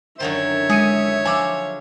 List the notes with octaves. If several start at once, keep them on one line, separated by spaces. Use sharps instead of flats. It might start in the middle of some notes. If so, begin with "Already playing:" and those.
F#2 D3 D#3 C#5 E5
G#3 G#4 C#7 D#7
F3 F#3 G#5 D6 E6